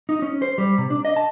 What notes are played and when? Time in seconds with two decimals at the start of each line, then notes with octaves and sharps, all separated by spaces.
0.09 D#4
0.22 C#4
0.42 C5
0.58 G3
0.78 C3
0.90 D4
1.05 D#5
1.16 A5